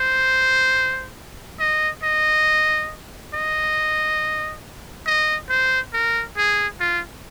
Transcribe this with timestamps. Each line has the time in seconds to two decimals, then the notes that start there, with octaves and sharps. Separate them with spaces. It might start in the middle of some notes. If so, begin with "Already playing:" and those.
Already playing: C5
1.60 D#5
2.03 D#5
3.34 D#5
5.06 D#5
5.50 C5
5.93 A#4
6.37 G#4
6.80 F4